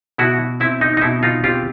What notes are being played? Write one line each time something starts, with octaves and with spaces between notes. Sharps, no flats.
B2 E4 F#4
C4 E4
D#4
D#4
B2 E4
D#4 F4
C4 F4 G4